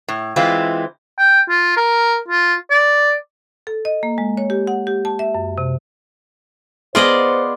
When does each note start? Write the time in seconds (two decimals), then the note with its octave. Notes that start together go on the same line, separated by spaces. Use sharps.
0.08 A2
0.36 E3 G#3 C4 E4 F4
1.18 G5
1.49 F4
1.77 A#4
2.28 F4
2.70 D5
3.67 A4
3.85 D#5
4.03 A#3
4.18 G#3
4.37 C#5
4.50 G4
4.67 F#5
4.87 G4
5.05 A5
5.19 E5
5.34 F#2
5.58 C3
6.95 B3 F4 G#4 C5 D5 D#5 F#5